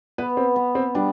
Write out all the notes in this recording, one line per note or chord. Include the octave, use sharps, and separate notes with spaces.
B3 B4
C4
B3
C4
G3 D4